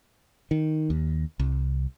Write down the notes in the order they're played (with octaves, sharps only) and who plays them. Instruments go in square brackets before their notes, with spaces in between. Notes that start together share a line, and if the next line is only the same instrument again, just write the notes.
[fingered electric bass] D#3
D#2
C2